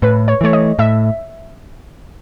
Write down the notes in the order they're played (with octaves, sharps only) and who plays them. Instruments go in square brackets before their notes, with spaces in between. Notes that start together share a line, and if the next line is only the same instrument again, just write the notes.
[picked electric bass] A2 [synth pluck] B4
[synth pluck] C#5
[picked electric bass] E3 A3 [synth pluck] C#5
[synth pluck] D#5
[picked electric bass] A2 [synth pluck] E5